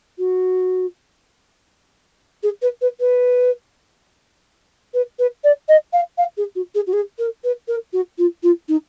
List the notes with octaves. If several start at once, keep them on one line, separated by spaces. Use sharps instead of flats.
F#4
G#4
B4
B4
B4
B4
B4
D5
D#5
F5
F5
G#4
F#4
G#4
F#4
G#4
A#4
B4
A#4
F#4
F4
F4
D#4